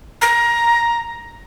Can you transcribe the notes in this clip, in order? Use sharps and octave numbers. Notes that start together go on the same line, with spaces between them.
A#5